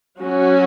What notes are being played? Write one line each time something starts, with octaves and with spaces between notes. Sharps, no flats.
F#3 C#4 F#4